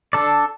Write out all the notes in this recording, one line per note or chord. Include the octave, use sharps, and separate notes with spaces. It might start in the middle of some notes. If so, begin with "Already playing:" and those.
D4 A4 D5